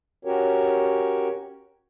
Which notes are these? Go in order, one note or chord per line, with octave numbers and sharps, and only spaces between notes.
C#4 F#4 G4 A#4 C#5